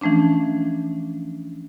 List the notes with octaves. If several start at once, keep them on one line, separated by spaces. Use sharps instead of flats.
E3 F3 A3 C#4 D4